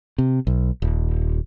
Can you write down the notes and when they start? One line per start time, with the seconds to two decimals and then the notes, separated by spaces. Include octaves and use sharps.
0.18 C3
0.47 B1
0.82 D#1